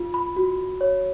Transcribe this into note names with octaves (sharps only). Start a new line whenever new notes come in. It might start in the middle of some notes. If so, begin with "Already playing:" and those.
Already playing: F4
B5
F#4
C#5